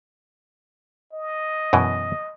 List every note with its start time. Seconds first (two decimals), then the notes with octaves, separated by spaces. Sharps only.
1.13 D#5
1.73 F#2 B2 E3